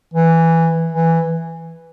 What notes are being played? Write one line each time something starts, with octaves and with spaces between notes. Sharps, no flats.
E3
E3